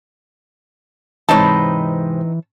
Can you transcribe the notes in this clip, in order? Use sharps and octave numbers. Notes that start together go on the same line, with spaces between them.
G#2 C3 E3 C4 D#4 B4 C#5 A5